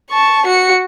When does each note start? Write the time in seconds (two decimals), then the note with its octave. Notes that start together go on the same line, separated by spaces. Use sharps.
0.11 A5 C#6
0.46 F#4 C#7